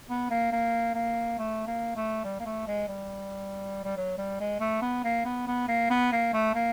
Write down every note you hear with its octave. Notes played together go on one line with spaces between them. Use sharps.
B3
A#3
A#3
A#3
A3
A#3
A3
G3
A#3
A3
G#3
G3
G3
F#3
G3
G#3
A3
B3
A#3
B3
B3
A#3
B3
A#3
A3
A#3